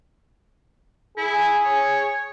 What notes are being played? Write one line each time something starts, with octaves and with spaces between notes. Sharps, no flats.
E4 G#4
C#5